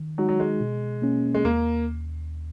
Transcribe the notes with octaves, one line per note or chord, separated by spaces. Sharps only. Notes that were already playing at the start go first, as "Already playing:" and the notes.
Already playing: D#3
F#3 G#3 D#4 F#4
F#3
G#3
B2
A#3 C#4
G#3
D#2 A#3